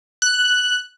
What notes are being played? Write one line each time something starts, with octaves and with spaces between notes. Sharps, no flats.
F#6